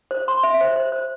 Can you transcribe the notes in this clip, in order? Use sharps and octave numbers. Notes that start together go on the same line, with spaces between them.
C5
C6
E5
C5
C5
C5